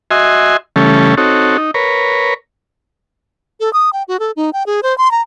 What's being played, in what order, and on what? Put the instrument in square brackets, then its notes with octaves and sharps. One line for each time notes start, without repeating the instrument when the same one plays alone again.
[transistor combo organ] F#4 D#5 E5 G#5 C6
C#3 E3 G3 A3 C#4 A4
C4 D#4 F#4 A4 C#5
D#4
A#4 B4 C#5
[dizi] A4
D#6
G5
F#4
A4
D#4
G5
G#4
C5
C6
A#5